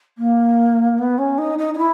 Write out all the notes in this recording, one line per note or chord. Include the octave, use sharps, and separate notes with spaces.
A#3
B3
C#4
D#4
D#4
D#4
E4